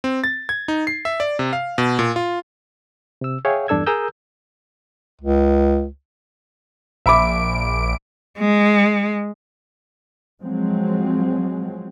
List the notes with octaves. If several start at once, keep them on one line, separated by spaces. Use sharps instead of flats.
C4
A6
G#6
D#4
C7
E5
D5
C3
F5
B2
A#2
F4
C3 E6
G#4 C#5 E5 F5 G5
E2 G2 D4 A4 E6 G#6
G#4 A#4 A#5 D#6 E6 G6
C#2
A#1 E5 B5 D6 D7
G#3
F3 F#3 G#3 C4